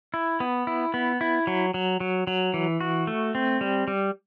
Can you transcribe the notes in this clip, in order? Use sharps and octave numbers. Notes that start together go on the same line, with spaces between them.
E4
B3
E4
B3
E4
F#3
F#3
F#3
F#3
E3
F#4
A3
C4
G3
G3